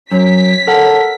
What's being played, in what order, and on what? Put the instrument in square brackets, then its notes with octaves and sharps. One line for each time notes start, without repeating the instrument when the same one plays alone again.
[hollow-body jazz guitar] F#2 [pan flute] C#5 [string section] B6
[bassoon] A4 [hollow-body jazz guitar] A#4 F#5